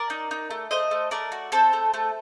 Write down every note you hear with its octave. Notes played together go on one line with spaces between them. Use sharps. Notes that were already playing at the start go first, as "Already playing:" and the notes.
Already playing: A#4 D5
D#4
D#4
A3
A3 C5 D#5
A3
A3 A#4 D5
F#4
C4 A4 C5
A3
A3